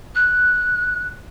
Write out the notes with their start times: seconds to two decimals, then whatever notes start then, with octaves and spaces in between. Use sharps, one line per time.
0.15 F#6